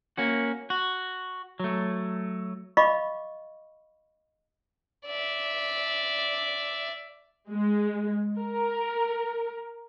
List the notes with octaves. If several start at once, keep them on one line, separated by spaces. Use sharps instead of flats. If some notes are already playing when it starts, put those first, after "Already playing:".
A#3 C#4 F#4
F#4
F#3 A3
D#5 F5 B5 C#6 D6
D5 E5
G#3
A#4